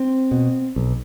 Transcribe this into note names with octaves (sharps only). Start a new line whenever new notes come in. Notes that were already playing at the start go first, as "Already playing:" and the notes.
Already playing: C4
B2
B1